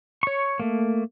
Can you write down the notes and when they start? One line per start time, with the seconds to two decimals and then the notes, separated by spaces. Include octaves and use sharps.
0.23 C#5 C#6
0.60 A3 A#3